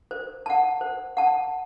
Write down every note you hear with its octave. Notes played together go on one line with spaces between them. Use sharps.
C5
F#5 A5
C5
F#5 A5